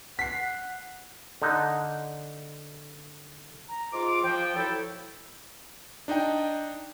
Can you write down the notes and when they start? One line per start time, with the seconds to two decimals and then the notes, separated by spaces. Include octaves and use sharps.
0.19 F#5 B6 C7
1.42 D3 D#4
3.68 A#5
3.93 G#2 F4 D6
4.07 D7
4.23 F3 G5
4.56 F#3 E4 A4
6.08 D4 D#4 D#5 G5